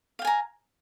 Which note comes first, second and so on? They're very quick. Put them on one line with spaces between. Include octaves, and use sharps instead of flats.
F5 G5 G#5 A#5